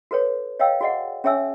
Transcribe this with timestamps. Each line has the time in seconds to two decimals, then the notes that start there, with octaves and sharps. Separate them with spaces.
0.11 F#4 A4 B4 C#5
0.59 C#5 D#5 F5 G5 E6
0.81 F#4 G#4 D5 D#5 F#5
1.24 C#4 G#4 C#5 E5 G#5 E6